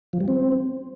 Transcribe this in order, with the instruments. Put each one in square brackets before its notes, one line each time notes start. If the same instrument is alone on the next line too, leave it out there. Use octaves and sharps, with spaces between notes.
[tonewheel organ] F3
G3
C4